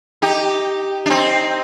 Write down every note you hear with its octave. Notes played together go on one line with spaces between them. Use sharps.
D#4 G4
D4
C4 D#4